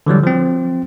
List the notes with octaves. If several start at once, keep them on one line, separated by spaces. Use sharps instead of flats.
D3 E3 F#3 G3
F3 C4